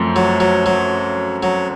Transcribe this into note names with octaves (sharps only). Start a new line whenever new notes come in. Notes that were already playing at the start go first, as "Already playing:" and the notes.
Already playing: F#2 F3 A3 C4
F#3
F#3
F#3
F#3